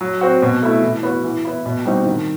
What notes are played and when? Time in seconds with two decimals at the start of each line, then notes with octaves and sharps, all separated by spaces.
0.01 F#3
0.21 C4 F#4
0.42 B2
0.62 A3 E4
0.82 E3
1.03 B3 F#4
1.24 E3
1.45 B3 E4
1.66 B2
1.85 G3 C4 D#4 F#4
2.06 D#3